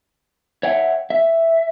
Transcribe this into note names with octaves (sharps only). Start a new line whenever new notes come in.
C#5 E5 F#5 G5
E5